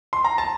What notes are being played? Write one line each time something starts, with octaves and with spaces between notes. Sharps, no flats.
C6
A#5
A5